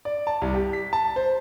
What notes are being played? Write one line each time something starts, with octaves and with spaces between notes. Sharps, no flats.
D5
A5
C2
G4
B6
A5
C5